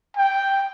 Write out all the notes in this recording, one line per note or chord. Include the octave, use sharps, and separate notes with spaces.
G5